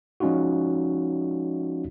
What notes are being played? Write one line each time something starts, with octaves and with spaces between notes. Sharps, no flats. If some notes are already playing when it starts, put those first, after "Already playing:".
F3 G#3 C#4 D#4 F4 F#4